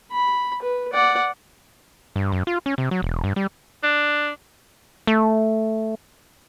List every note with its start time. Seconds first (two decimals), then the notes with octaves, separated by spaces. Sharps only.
0.11 B5
0.62 B4
0.93 D5 F#5
2.16 G2
2.32 F#2
2.47 F4
2.66 C#4
2.78 C3
2.91 F#3
3.02 E1
3.24 G2
3.36 G3
3.83 D4
5.07 A3